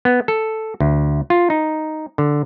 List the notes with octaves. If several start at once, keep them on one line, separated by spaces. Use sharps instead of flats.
B3
A4
D2
F4
D#4
D3